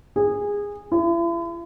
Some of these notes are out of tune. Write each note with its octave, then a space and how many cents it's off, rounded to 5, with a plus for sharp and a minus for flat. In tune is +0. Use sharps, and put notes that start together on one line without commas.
G#4 -20
E4 +40